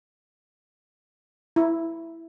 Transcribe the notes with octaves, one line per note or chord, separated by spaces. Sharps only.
E4